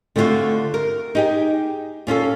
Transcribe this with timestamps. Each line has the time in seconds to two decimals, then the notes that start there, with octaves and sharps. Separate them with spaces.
0.16 D3 A3 C4 D4 F4 F#4
0.74 A#4
1.15 D#4 G4 G#4
2.07 A#2 C#4 F4 A4